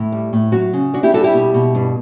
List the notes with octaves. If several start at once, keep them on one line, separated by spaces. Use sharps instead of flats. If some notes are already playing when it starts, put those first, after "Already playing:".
Already playing: A2 E4
G3
A2
F#3 F#4
C#3
D4 F#4
E4 G4
G3 F#4 A4
E4 G4
B2
B2
G2